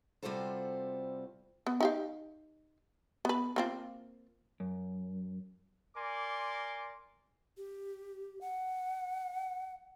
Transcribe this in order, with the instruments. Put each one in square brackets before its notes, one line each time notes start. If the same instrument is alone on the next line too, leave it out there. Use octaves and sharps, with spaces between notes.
[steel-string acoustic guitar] C3 G3 F4 F#4 A4 C5
[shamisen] B3
D#4 G4 F5
B3 B4
A#3 C4 F4
[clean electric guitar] F#2
[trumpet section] A#4 D5 G#5 C6 D6
[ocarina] G4
F#5